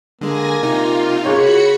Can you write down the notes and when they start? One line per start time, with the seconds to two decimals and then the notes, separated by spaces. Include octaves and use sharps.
0.21 D3 G#3 A#3 G#5 A#6
0.63 C3 D#4 F4
1.25 C#3 G#3 A#3 F#4 C#5 B5 C#7